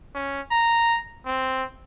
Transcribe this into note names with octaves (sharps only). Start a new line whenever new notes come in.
C#4
A#5
C4